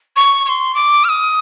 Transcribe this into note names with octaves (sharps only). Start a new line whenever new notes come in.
C#6
C#6
C6
D6
F6
D#6